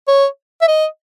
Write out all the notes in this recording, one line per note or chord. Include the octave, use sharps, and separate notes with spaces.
C#5
E5
D#5